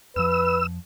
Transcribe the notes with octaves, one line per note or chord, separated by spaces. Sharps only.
F2 F3 B4 E6